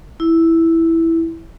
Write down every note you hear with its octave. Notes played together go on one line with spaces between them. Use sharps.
E4